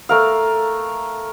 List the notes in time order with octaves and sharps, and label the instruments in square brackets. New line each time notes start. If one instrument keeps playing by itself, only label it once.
[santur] A3 A#4 F5